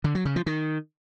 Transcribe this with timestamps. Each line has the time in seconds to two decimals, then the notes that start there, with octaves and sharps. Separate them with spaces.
0.04 D3
0.15 F#3
0.25 C#3
0.36 F3
0.46 D#3